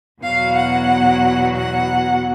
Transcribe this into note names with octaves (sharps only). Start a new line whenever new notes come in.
E2 B2 F#3 F5
F#5
F#5